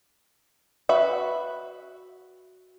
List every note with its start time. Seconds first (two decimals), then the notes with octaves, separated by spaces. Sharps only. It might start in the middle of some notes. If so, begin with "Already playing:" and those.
0.89 F#4 B4 E5